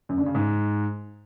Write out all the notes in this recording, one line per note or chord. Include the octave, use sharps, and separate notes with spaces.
F#2
D3
C#3
G#2